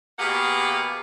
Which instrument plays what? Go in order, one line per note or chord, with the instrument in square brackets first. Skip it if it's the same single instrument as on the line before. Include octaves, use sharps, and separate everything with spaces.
[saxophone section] B2 A#3 G4 G#4 F5 F#5